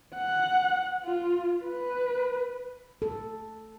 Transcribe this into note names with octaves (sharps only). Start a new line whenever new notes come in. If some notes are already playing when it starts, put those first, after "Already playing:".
F#5
F4
B4
A4